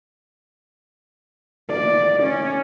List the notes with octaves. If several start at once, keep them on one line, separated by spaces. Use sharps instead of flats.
D5
C#4